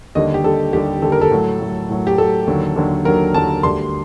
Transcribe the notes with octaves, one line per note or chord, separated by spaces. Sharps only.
D#2 D3 G3 D#5
G4
D#2 D3 G3 A4
D#2 D3 G3 G4
D#2 D3 G3 A4
A#4
A4
A2 F#3
A2 F#3
A2 F#3
G4
A2 F#3 A4
D#2 D3 F#3
D#2 D3 F#3
D#2 D3 F#3 A#4
D#2 D3 F#3 A5
D2 D3 G3 C6